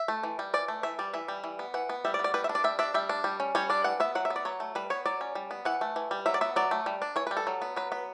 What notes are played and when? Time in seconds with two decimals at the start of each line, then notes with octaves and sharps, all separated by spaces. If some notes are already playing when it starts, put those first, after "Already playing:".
Already playing: E5
0.08 A3
0.23 E3
0.39 G3
0.54 E3 D5
0.68 A3
0.83 E3 E5
0.99 G3 D5
1.14 E3 E5
1.28 G3
1.44 E3
1.59 B3
1.74 E3 F#5
1.89 B3
2.05 G3 E5
2.14 D5
2.19 B3
2.24 D5
2.34 G3 B4
2.44 E5
2.49 D4
2.55 D5
2.64 G3 E5
2.79 D4 E5
2.94 G3 E5
3.09 D4
3.24 G3
3.40 C#4
3.55 G3 C#5
3.70 D4 D5
3.84 E3 F#5
4.00 B3 E5
4.15 F#3 F#5
4.25 E5
4.30 B3
4.36 D5
4.45 F#3 C#5
4.60 A3
4.75 G3 B4
4.90 B3 C#5
5.06 F#3 D5
5.21 C#4
5.35 G3
5.51 B3
5.65 E3 F#5
5.81 A3
5.96 E3
6.11 G3
6.26 F#3 E5
6.34 D5
6.41 B3 E5
6.56 F#3 D5
6.71 A3
6.86 G3
7.02 D4
7.16 E3 C#5
7.27 B4
7.31 G3
7.37 A4
7.47 F#3
7.62 B3
7.76 F#3 B4
7.92 B3 B4